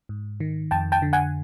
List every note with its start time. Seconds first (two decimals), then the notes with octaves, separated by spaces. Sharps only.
0.09 G#2
0.40 D#3
0.71 F2 G5 A5
0.92 G5 A5
1.02 D3
1.13 F#5 G#5